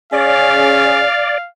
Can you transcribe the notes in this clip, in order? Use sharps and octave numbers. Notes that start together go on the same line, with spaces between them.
C#4 G#4 D5 F5